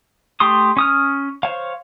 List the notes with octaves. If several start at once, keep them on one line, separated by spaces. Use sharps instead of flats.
A3 G4 C6 D#6
C#4 D#6 F6
C5 C#5 F5